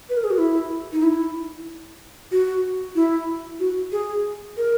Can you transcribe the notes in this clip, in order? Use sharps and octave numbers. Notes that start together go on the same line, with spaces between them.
B4
A#4
G#4
F#4
E4
D#4
E4
F#4
E4
F#4
G#4
A#4